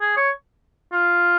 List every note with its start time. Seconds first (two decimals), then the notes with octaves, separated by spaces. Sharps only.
0.01 G#4
0.17 C#5
0.93 F4